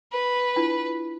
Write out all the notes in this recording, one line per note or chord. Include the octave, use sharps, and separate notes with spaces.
B4
D4 E4 F4